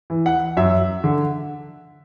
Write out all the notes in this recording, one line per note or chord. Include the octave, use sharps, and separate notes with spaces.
E3
F#5
F#2 E5
D3